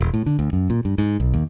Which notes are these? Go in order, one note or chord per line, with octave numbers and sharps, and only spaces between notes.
E1
A2
D3
D2
F#2
A#2
G2
G#2
B1
D#2